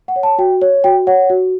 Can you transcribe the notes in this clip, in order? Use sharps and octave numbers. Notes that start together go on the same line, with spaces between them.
F#5
C#5
A5
F#4 G5
C#5
F#4 G5
C#5 F#5
F#4